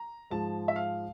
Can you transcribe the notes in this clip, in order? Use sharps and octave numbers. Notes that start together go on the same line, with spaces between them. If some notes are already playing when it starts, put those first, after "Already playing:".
Already playing: A#5
G#2 F3 G#3 A5
E5
F5